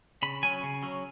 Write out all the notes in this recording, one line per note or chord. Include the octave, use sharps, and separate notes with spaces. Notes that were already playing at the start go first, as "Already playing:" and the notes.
C#3 B5
F#3 C#4 G#5
C#3
F#3 C#4